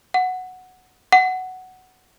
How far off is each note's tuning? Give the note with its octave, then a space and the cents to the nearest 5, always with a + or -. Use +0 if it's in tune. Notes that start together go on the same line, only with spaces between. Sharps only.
F#5 -5
F#5 +5